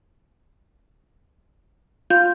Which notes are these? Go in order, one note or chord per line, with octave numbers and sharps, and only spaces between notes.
F4 G6